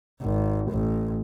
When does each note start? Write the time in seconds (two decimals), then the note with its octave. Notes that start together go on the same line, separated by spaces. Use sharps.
0.22 G#1
0.71 A1